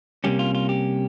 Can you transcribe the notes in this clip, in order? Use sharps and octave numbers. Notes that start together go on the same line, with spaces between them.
C3 G3 A#3 C#4 G4
F4
F4
G4